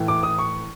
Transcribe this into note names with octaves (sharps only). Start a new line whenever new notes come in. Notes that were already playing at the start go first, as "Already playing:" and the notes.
Already playing: A2 E3
D6
D#6
C#6